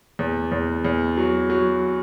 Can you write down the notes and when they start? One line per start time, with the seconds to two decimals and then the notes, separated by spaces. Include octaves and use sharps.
0.19 E2
0.52 E2
0.85 E2
1.17 F#3
1.50 F#3